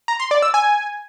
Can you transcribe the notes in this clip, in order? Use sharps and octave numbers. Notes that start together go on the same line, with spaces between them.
A#5
C6
D5
E6
G#5